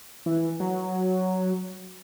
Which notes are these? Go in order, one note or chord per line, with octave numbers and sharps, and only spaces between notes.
E3
F#3